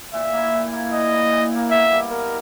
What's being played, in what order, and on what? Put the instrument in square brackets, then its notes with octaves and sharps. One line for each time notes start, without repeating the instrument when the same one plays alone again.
[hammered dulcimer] A#2 [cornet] E5
[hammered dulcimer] A#3 E4
A#2
A#3 E4
[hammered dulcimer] A#2 [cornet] D#5
[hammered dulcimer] A#3 E4
A#2
A#3 E4
[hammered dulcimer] B2 [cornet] E5
[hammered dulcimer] G3 A#3
[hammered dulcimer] B2 [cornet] A#4